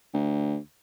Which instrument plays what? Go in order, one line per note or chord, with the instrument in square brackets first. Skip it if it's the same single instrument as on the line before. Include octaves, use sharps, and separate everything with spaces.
[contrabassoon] D2